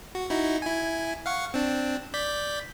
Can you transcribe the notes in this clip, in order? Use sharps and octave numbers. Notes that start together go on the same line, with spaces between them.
F#4
D#4 E4 F#4
E4 G#5
F5 F#5 C#6
C4 D4
D5 G6 B6